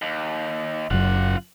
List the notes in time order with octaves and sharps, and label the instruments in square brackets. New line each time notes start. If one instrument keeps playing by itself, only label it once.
[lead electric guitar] D#2
[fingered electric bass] F#1 F#2 [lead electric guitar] F4 F#5